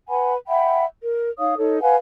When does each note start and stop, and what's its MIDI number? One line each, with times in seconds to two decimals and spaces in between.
0.08 0.34 71
0.08 0.34 78
0.08 0.34 80
0.08 0.34 83
0.47 0.84 76
0.47 0.84 78
0.47 0.84 79
0.47 0.84 83
1.04 1.28 70
1.38 1.55 63
1.38 1.55 73
1.38 1.55 77
1.38 1.55 87
1.57 1.81 63
1.57 1.81 69
1.57 1.81 73
1.81 1.95 71
1.81 1.95 77
1.81 1.95 78
1.81 1.95 80